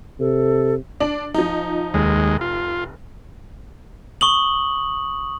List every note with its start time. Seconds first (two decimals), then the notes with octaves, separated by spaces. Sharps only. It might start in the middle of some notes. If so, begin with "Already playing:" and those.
0.20 C3 A4
1.00 D4 F#7
1.34 F3 D#4
1.94 F1 D#2 G#3
2.41 F4
4.21 C#6 D#6 F#7